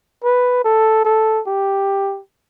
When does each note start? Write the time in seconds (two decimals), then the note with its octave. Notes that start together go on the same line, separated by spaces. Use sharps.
0.24 B4
0.65 A4
1.05 A4
1.47 G4